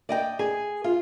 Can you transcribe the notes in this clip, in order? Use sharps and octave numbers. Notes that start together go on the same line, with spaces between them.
D5 D#5 G5
G#4
F4